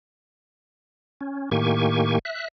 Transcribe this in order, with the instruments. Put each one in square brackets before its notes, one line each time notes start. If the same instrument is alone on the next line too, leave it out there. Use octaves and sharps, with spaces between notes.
[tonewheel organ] C#4
A2 D#3 A#3 G4 G#5 C#6
E5 F#6